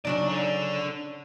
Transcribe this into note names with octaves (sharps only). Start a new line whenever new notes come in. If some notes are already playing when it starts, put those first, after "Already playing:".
C#3 F#3 D4 D#4 D5
D4 A4